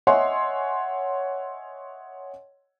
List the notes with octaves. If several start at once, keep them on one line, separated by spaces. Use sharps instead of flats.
C#5 D#5 E5 F#5 G#5 C6